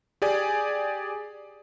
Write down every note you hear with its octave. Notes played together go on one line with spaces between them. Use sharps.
G4 G#4 D5 G#5